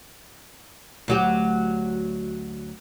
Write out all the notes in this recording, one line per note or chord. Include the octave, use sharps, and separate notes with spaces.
D2 F#3 G4